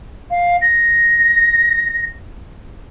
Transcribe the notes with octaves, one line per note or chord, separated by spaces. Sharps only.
F5
A#6